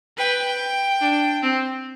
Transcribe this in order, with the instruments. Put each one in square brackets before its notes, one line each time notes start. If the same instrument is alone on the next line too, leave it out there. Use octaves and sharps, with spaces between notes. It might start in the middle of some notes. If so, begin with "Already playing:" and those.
[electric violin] B4 [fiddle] G5
[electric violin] D4
C4